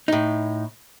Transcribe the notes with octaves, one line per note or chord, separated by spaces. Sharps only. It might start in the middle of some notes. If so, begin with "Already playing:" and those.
A2 D#4